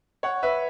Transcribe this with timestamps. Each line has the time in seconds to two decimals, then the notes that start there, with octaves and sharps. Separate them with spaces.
0.23 C#5 F#5
0.43 B4 E5